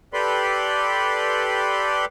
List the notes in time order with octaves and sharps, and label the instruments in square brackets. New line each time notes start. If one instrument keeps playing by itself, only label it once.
[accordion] G4 A4 B4 D5 B5 C6